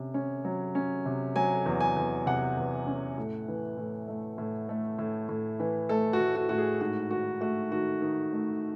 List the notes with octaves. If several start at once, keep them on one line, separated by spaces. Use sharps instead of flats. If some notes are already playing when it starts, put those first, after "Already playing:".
Already playing: C3 C#4
C#4
F#3
C#4
C3
F#3 G#5
E2
G#5
E2
C3 F#5
E2
C#4
A2
E3
A2
A3
A2
A3
A2
A2
E3
A3 A4
F#4
A2
F#4
A2 F#4
G#4
G#2 F#4
D#3 F#4
A3 F#4
D#3 F#4
D#3
A3